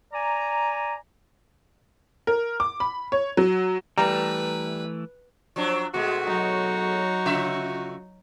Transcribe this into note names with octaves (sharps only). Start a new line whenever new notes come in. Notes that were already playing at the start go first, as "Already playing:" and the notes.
D5 G#5 A#5
A#4
D6
B5
C#5
F#3
E3 G3 A3 B4 A#5
F3 F#3 D4
B2 G#3 A3 F#4
F#3 D#4 C#5
C#3 F4 E5